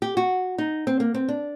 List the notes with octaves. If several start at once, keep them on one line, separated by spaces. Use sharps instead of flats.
G4
F#4
D#4
C4
A#3
C4
D4